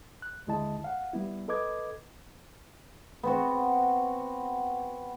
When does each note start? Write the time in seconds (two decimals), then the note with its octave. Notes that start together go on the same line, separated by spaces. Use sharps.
0.22 F#6
0.47 D#2 D3 G#3 E4 D#5 A5
0.84 F5 F#5
1.13 G3 B3 E4
1.48 A4 B4 D#5 D6 G#6
3.23 B3 C4 F#4